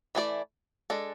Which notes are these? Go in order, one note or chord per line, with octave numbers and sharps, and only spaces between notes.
E3 A3 E4 G#4 D5
G#3 D4 A4